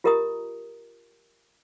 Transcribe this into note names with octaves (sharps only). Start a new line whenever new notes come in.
F4 G4 A#4 D#5 A#5 D#6